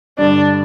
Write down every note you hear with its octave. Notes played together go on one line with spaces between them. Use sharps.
G2 D3 G3 D4